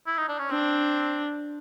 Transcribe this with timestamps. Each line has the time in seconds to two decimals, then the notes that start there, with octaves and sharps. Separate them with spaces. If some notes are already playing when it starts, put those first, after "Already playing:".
0.07 E4
0.17 D#4
0.28 D4
0.39 C#4
0.50 C4 D4